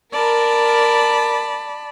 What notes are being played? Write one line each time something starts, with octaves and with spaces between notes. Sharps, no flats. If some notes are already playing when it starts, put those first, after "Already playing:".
A#4 D5 A5 B5